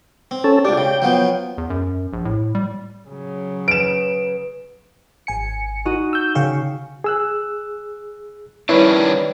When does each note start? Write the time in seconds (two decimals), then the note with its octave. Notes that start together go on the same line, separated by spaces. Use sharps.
0.31 C4
0.44 C#4 A4
0.65 C#2 D4 G4 D5
0.77 C#3 G5
1.02 F3 F#3 B3
1.58 E2
1.70 F#2
2.13 A#1
2.25 A2
2.55 G3
3.08 C#3 F#3
3.68 B4 D7 E7
5.27 G#1 G#5 C#7
5.85 D#4 F#4 D#7
6.13 E6 G6
6.35 C#3 F5 G5 C#6
7.04 G#4 E6 F#6
8.69 D#3 G3 C#4 D4 E4 B4 C#5